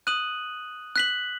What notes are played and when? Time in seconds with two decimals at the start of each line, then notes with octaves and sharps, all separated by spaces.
0.07 D#6 F#6 D#7 F#7
0.96 F#6 B6 F#7